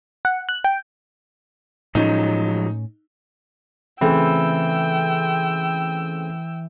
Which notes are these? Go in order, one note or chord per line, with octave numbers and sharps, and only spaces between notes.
F#5
F#6
G5
A2 F3 F#3 G#3 C#4 D#4
C#3 E3 A3 C4 G5 E6